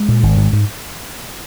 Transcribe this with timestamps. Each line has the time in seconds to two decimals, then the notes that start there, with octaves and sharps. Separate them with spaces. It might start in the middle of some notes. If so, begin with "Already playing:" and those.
Already playing: G#3
0.08 A#2
0.23 G#1
0.37 G#2
0.53 G#2